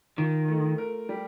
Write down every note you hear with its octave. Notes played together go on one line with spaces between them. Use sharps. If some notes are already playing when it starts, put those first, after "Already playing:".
D#3 F4
A3
A#4
G3